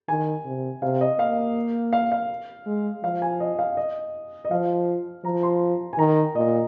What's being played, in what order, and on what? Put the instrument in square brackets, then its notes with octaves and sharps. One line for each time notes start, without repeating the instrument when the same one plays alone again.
[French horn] D#3 [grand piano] G#5
[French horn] C3
[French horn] C3 [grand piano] F5
[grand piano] D#5
[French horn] A#3 [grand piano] F5
[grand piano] F5
F5
[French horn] G#3
[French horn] F3 [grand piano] F5
[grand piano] G#5
D#5
F5
D#5
D#5
[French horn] F3 [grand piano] F5
[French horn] F3 [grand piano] A#5
[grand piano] C6
G#5
[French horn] D#3 [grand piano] A#5
[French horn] A#2 [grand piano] D#5